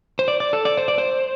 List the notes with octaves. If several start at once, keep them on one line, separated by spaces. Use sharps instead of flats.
C5
D5
D5
A4
D5
C5
D5
C5